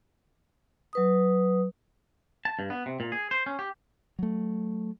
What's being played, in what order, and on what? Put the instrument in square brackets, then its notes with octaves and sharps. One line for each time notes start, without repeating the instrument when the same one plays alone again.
[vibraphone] F#3 B4 D#6
[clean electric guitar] A5
G2
B3
C3
A#2
G#4
C5
C#4
G4
[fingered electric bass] F#3 A3